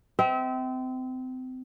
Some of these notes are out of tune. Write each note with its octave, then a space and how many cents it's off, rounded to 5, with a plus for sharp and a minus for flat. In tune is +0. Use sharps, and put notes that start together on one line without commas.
C4 -30 E5 -35